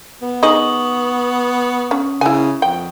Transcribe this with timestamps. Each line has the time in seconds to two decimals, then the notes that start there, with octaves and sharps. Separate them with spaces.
0.22 B3
0.43 D#4 G#4 D#5 C#6 D#6 F#7
1.91 C#4
2.21 C#3 E4 G#5
2.62 F2 G5